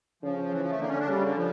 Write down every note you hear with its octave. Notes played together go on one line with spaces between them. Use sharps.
C#3 F3
E3
F3
A3
D3 A#3
C#4
D4
C#3 G3
D3
F3